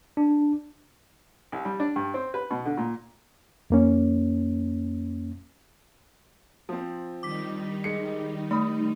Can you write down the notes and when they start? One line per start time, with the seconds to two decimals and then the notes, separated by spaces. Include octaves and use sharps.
0.17 D4
1.52 C2
1.65 G3
1.80 D4
1.96 G2
2.14 C4
2.34 B4
2.51 B2
2.65 D3
2.78 A#2
3.70 F2 A#3 C#4
6.69 F3 C4
7.23 D#3 G3 D#4 D6 B6
7.84 G#3 C#7
8.51 A3 B5 D#6